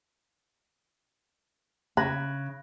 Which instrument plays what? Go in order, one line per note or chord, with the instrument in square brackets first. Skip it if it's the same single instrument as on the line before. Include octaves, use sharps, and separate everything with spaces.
[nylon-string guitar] C#3 [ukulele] B5 [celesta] F#6 G#6 A#6